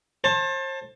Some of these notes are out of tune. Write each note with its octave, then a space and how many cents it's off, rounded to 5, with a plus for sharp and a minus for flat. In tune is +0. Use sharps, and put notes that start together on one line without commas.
C5 +40 A5 +15